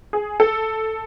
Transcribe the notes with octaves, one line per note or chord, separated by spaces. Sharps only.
G#4
A4